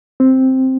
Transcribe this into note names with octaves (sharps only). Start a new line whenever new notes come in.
C4